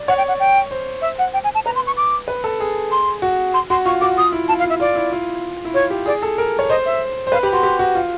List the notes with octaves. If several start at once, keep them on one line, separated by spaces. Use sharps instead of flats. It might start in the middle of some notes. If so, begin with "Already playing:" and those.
Already playing: D5
C#5 F#5
G5
F#5
G5
C5
E5
F#5
G5
G#5
A5
B4 A#5
C6
C#6
D6
B4
A4
G#4
C6
F#4
C6
F#4 C6
F4 C#6
F#4 D6
F4 D#6
E4
F4 A5
F5
F4
E5
F4 D5
E4
F4
E4
F4 C#5
G4
G#4 D5
A4
A#4
C#5
C5 D#5
E5
C5
B4 F5
G4 B5
F#4 C6
G4
F#4
F4